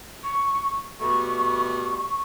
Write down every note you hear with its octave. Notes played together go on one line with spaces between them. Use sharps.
C#6
B2 G3 A3 C#6